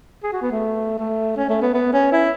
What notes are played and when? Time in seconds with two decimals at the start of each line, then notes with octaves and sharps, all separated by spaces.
0.23 G#4
0.32 F#4
0.42 B3
0.51 A3
0.98 A3
1.37 C#4
1.49 A3
1.61 B3
1.74 B3
1.93 C#4
2.12 E4